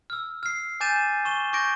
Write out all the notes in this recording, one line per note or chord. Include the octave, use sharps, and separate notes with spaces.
E6 F6
F6 C7
G#5 D6 G6 A6 D#7 E7
C#6 E7 G7
C#6 D6 G6 A#6 D7